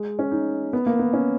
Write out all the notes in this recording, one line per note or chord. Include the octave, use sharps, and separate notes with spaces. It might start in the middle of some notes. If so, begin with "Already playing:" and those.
Already playing: G#3
C#4
D#4
B3
A#3
B3
C#4